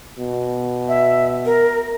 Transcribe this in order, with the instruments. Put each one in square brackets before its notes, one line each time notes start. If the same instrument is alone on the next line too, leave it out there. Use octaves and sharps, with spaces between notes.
[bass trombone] B2
[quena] E5
A#4